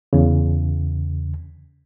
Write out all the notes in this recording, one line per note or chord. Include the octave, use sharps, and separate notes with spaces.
E2 C#3